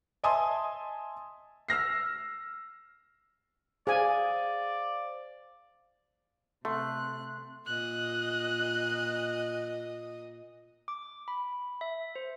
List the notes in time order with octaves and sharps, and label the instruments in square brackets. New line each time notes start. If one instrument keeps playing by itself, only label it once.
[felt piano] D#5 E5 G#5 A5 C6 D#6
E6 F6 A#6 C7
[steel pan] G#4 G#5 [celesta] C5 F5 [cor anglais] D5
[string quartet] C3 F#6 [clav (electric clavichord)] A3 [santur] C6
[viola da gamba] A#2 D#5 [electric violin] F#6
[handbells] D6
B5
E5
C5